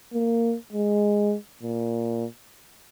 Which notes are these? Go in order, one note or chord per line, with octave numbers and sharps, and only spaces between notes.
A#3
G#3
A#2